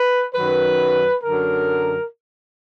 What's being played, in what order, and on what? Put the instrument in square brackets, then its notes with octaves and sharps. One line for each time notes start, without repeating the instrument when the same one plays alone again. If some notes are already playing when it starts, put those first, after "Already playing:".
Already playing: [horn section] B4
F#2 D#3 F#3 B4
F#2 D3 F#3 A#4